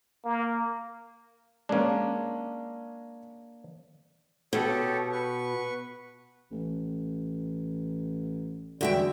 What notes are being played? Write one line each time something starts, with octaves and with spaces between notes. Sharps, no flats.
A#3
G#3 A#3 C#4 D4
B2 G4 A4 C#5
B4 C#6
A1
E2 D3 G3 G#3 F#4 E5 G5